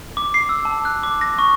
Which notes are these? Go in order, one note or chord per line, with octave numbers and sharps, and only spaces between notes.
D6
C7
E6
A5
F#6
D6
A#6
C#6